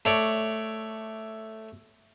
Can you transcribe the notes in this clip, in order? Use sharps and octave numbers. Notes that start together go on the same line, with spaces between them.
A3 C#5 D5